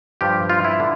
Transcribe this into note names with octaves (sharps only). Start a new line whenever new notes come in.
G2 F3 G4
F4
E4
D3